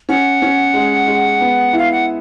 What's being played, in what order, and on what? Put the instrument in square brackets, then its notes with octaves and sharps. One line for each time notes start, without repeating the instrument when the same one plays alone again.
[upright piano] C#4 [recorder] F#5
[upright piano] C#4
G#3
G#3
B3
[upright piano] E4 [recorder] F5
[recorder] F#5